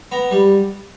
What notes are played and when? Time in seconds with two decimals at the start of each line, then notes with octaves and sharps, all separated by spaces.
0.12 B3 A#5
0.31 G3